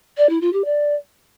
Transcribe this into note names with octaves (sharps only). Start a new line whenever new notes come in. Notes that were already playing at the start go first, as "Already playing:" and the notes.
D5
E4
F4
G4
D5